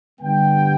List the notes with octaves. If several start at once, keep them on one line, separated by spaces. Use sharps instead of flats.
G2 D3 G3 B3 G5